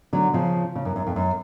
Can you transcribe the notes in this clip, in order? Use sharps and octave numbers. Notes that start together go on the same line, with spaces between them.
D3 F#3
C#3 F3
C#3
F#2
F#2
F2
F#2